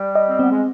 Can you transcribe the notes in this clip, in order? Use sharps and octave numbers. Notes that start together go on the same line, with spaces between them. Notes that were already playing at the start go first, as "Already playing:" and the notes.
Already playing: G3
D#5
C4
B3 C4
G#3